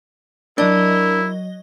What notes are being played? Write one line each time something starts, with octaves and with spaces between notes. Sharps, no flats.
F#3 D4 E4 A#4 D#5 G7